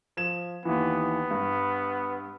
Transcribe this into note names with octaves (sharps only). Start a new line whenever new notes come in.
F3 G#6 E7
D#2 E3 B3
G2